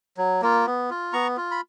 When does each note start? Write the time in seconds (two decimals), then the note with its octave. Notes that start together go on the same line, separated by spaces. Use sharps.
0.17 F#3
0.42 A#3 F4
0.66 B3
0.90 F4
1.13 B3 A#5 C#6
1.37 F4
1.51 B5